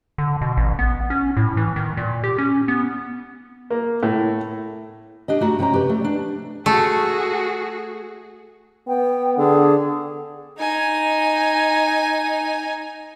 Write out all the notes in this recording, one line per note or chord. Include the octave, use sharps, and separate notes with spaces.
D3
B2
A1
B3
C#4
A2
E3
D#3
A#2
G4
C#4
B3
A#3
A2
D4 G4 D#5
A3 F#4 A#5
C3 C#4 G5 A#5
G4 B4
A3
D4
A3 F#4 G#4
B3 G5
D3 G#4
D#4 G#5